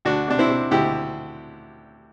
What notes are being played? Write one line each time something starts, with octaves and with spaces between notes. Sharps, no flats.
D2 D4 F#4
C3 D4
C4 E4
C3
D2 E4 G4